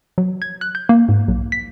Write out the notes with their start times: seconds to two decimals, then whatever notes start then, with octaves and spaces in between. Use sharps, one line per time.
0.18 F#3
0.42 G#6
0.61 F#6
0.75 G6
0.89 A#3
1.09 G#2
1.28 B1
1.52 B6